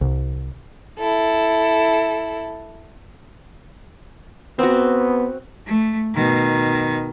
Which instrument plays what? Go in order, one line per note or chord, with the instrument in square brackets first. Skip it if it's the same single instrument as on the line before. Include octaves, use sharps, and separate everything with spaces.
[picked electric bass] C2
[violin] E4 A4
[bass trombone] B3 [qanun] C4 F#4
[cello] A3
B2 D#3